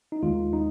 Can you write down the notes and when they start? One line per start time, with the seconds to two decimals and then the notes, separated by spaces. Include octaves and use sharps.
0.12 D#4
0.23 D#2 D#3 G#3 F4
0.53 D#4